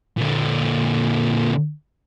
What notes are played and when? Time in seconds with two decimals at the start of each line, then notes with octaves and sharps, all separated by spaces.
0.18 A#2 D3